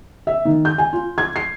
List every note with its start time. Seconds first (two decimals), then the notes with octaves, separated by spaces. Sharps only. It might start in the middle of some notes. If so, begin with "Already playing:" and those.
0.27 E5
0.45 D#3
0.65 G6
0.78 G#5
0.93 F4
1.18 G#6
1.36 C7